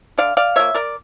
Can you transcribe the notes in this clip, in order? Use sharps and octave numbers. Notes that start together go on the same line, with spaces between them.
D3 D5 F5
D5 F5
F3 A#3 C#5 E5
A#4 D5